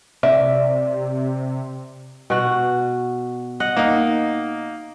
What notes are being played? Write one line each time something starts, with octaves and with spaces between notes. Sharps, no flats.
C3 D5 E5
B2 F#4
D#5 F#5
A#3 D#4